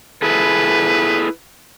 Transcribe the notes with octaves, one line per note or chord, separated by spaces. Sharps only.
E4 G#4 A4 B4